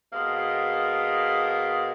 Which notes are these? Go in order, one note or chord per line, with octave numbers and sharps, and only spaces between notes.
B2 G#3 A#3